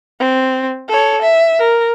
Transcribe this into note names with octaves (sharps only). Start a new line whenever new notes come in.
C4
A4 C#5
E5
A#4